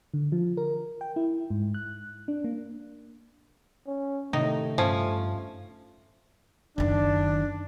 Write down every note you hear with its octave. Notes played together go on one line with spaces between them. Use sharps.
D3
F3
A#4
G5
E4
G#2
F#6
D4
A#3
C#4
A2 C3 D#3 A3 D#4
G2 F3 C#4
F#1 D#3 D4